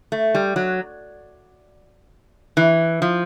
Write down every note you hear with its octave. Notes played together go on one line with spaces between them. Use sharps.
A3
G3
F#3
E3
F3